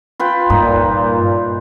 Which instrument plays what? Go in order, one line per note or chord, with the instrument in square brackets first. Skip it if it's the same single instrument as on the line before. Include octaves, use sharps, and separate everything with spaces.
[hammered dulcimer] F4 B4 G5
[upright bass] G2 [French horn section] A#2 [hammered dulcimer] D#4